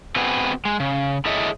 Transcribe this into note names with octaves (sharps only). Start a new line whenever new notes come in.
B3 C4 F#4 G#4 B4
G#3
C#3
E4 G#4 A4 C#5 D#5 E5